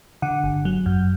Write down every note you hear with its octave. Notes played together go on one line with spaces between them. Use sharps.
D3 F#5
G1
F#3
F#2